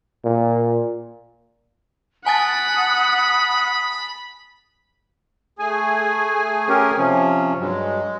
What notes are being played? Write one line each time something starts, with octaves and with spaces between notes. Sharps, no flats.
A#2
F#5 G#5 A5 B5 D#6 A6
A3 G#4 G#5
C#4 G4 A#4
C3 F3 C#4
G2 F#3 G#3